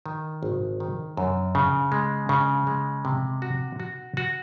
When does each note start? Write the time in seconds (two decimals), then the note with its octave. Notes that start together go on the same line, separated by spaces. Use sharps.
0.06 D#3
0.43 G#1
0.80 D#3
1.17 F#2
1.55 C#3
1.92 G#3
2.29 C#3
2.67 G#3
3.05 C3
3.42 F#4
3.80 F#4
4.17 F#4